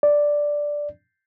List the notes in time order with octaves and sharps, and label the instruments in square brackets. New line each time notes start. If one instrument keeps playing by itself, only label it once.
[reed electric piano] D5